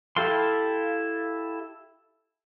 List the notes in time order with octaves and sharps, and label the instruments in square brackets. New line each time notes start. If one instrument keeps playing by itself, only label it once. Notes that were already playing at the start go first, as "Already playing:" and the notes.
[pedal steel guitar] E4 G4 A4 F5 C6